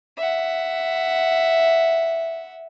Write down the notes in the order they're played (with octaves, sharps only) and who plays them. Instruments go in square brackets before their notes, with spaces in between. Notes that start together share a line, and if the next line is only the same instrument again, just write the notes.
[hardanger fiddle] E5 F#5